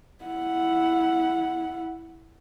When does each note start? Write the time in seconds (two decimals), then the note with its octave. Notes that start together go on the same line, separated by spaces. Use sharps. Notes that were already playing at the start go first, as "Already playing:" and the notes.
0.25 E4 F#5